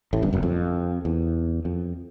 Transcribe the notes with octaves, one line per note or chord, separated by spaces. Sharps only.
A1 A2
G1 G2
F#1 F#2
F2
E2
F2